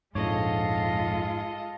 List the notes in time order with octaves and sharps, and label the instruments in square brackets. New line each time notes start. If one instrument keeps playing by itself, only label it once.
[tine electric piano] A#1 F2 C#5 [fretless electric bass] G#2 [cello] G#3 F4 [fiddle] A4 D#5